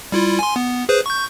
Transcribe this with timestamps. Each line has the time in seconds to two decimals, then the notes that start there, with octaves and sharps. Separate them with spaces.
0.12 G3 E4 F4
0.39 G#5 C6
0.56 B3
0.89 G#4 B4 C5
1.06 C#6 G6